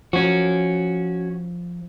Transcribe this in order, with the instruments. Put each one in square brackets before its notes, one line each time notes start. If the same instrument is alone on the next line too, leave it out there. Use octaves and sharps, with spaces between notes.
[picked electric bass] F3 [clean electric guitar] C#4 F#4